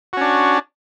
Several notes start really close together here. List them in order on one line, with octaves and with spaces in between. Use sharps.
F#4 C#4 D4